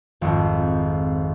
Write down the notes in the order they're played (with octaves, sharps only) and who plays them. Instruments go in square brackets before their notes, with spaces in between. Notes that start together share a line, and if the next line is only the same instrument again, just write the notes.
[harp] G#1 F2